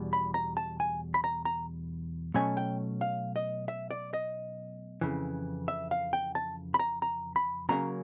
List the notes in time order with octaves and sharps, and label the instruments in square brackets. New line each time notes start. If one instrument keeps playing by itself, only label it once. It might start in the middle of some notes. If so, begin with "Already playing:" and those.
Already playing: [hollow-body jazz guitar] E2 B2 G3
B5
A#5
A5
G#5
B5
A#5
A#5
B2 F#3 A3 C#4 G#5
G5
F5
D#5
E5
D5
D#5
F2 C#3 E3
E5
F5
G5
A5
B5
A#5
A#5
B5
C#3 F#3 A#3 C#4 A#5